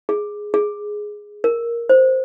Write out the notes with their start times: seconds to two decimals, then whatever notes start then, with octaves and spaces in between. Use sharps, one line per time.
0.09 G#4
0.54 G#4
1.44 A#4
1.89 C5